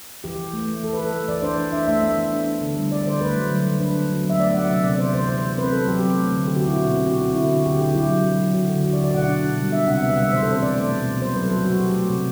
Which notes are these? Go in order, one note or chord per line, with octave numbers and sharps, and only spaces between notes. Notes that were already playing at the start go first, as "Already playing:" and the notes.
E3 G4
E3
A3
A3
E3 A4
B4
E3 A4
A3
E3 D5
D4 C5
E3
D4 E5
A3 E5
B3 E5
E3
D4
D4
D3
G3
G3 D5
D3 C5
A3 B4
F#3
D3
D3
D4 B4
D3
F#3
B3
E5
A3 D5
F#3 F#5
C3 E5
C3 D5
B3 C5
E3 C5
E3 C5
E3
C4 B4
F#3 A4
F#3 G4
C4
A3
D3
D3 G4
F#4
D3
E4
B2 F#4
C4 G4
B2 F#4
C4 F#4
D3 E4
D3 F#4
D3 G4
D3 G4
F#3 E4
F#3
F#3
F#3
D3 F#4
D3
D3 F#4
D5
D3
D5
B2 F#5
D4
B2
G3
D4 E5
C3 F#5
B3 E5
F#5
G3
E5
E3 C5
A4
C4 C5
E3 D5
A3
B2
B2
F#3 C5
B4
F#3
A4
F#3 F#4
F#3 F#4
F#3 G4
A3
C3